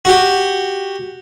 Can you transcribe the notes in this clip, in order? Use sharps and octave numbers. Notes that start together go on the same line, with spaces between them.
F#4 G4